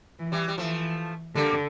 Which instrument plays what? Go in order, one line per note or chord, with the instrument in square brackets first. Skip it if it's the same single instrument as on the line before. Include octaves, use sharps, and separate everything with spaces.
[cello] E3
[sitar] E3 G3
G3
[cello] E3 [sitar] F3 A3
[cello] D3 [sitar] G3 A#3